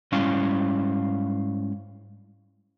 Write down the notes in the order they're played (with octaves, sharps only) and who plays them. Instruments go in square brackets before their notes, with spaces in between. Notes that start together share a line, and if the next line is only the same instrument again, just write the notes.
[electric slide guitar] G#2 G3 C#4 E4 F5